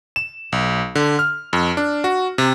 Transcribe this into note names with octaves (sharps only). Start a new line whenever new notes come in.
E7
B1
D3
F6
F2
D4
F#4
C3